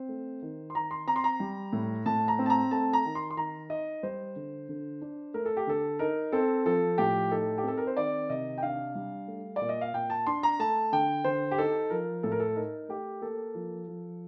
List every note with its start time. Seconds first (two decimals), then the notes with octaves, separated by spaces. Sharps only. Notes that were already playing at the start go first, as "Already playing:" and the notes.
Already playing: C4 C5
0.09 A3
0.42 D#3
0.70 C6
0.75 D#3 A#5
0.91 C6
1.07 C4 A#5
1.16 C6
1.24 A#5
1.40 G3
1.73 A2
2.06 A2 A5
2.28 A#5
2.39 C4
2.46 A5
2.50 A#5
2.71 A3 A5
2.93 A#5
3.05 D#3
3.15 C6
3.30 C6
3.37 D#3 A#5
3.70 D#4 D#5
4.03 G3 C5
4.36 D3
4.69 D3
5.01 D4
5.34 A3 A#4
5.45 A4
5.57 G4
5.67 D3 A4
5.99 D#4 A#4
6.32 C4 A4
6.66 F3 A4
6.98 A2 G4
7.31 D#4 A4
7.58 G4
7.63 C4 A4
7.77 A#4
7.87 C5
7.97 D#3 D5
8.30 C3 D#5
8.58 G5
8.62 D4 F5
8.95 G3
9.28 A3
9.56 A#2 D5
9.69 D#5
9.81 F5
9.93 A#2 G5
10.10 A5
10.27 D4 C6
10.43 A#5
10.59 A3 A5
10.92 D3 G5
11.24 D3 C5
11.51 G4
11.58 D#4 A4
11.90 F3 A#4
12.23 A2 A4
12.32 A#4
12.40 A4
12.56 D#4 A#4
12.89 A3 G4
13.22 A#3 A4
13.55 F3
13.87 F3